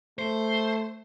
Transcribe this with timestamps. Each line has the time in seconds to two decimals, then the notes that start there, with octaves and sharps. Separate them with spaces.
0.19 A3 C5